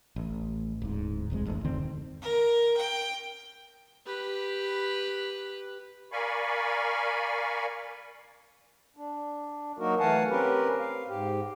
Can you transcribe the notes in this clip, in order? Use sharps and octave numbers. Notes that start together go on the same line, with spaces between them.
A1
D1 G#2
D#1 A#1 F2 G#3
A1 F2
D1 D3 D#3 C4
A#4
G5
G4 B4
A#4 D5 F5 G#5 B5 C#6
D4
F#3 A#3 D#4 F#4 A#4
E3 A3 F5 F#5 G#5 A5
C4 C#4 G4 A#4 B4
F5
G#2 G4